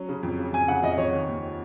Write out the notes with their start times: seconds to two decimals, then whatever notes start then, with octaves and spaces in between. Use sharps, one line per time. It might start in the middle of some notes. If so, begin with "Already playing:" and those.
Already playing: F#3 C#4
0.09 C#3
0.23 F2
0.39 C#3
0.53 F2 G#5
0.68 C#3 F#5
0.83 F2 D#5
0.98 F2 C#5
1.13 D#3
1.28 D#2